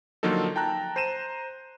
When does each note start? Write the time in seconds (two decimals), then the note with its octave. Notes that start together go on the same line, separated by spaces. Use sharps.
0.23 D3 F3 F#3 A#3 D#4 A4
0.56 G5 A5 A#5 F#6
0.96 C5 A#5 D#7 E7